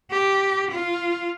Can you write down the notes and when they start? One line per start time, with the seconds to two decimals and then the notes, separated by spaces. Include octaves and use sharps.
0.11 G4
0.71 F4